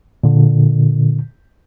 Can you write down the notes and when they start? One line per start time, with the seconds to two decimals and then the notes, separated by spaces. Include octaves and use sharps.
0.24 A#2 D3